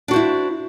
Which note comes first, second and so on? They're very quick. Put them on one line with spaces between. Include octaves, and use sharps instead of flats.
D4 F#4 C5 E4